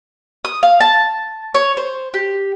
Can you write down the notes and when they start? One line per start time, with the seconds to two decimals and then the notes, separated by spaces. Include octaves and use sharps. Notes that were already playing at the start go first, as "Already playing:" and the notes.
0.45 D#6
0.63 F5
0.80 A5
1.54 C#5
1.77 C5
2.14 G4